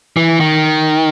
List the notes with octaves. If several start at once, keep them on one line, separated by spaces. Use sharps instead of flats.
E3
D#3